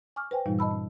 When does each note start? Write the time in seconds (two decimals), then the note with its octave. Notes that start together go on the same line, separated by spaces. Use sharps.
0.16 G#5 C#6 D6 F6
0.31 B4 C5 G5 G#5
0.46 G2 A#2 E3 G3 D#4
0.59 D#5 A5 B5 E6
0.71 C#4